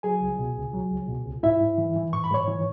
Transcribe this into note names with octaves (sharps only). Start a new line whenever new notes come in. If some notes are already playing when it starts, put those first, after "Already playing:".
F#3 G#4 G#5
C#2
B2
C#2
F#3
C#2
B2
C#2
G#2 E4 E5
G#2
E3
E3
G#2 C#6
B5
G#2 C#5 C#6
E3